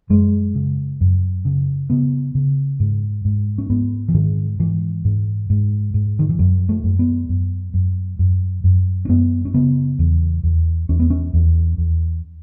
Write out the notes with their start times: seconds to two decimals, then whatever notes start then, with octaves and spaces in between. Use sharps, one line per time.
0.10 F#2 G#3
0.55 C#3
1.01 F#2
1.45 C#3
1.90 C#3 B3
2.35 C#3
2.80 G#2
3.25 G#2
3.58 C#4
3.70 G#2 B3
4.08 E3
4.14 G#2 D#3
4.59 G#2 E3
5.05 G#2
5.50 G#2
5.94 G#2
6.19 D#3
6.29 E3
6.39 F#2 F#3
6.69 A3
6.84 F#2
6.99 B3
7.29 F#2
7.74 F#2
8.19 F#2
8.64 F#2
9.05 C#4
9.09 F#2 B3
9.45 C#4
9.54 C#3 B3
9.99 E2
10.44 E2
10.89 E2 C#4
11.00 B3
11.10 C#4
11.34 E2
11.78 E2